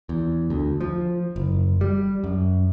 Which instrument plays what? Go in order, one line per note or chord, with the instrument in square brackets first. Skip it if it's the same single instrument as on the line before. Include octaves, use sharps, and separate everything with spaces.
[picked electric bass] E2
D2
F3
F#1
G3
F#2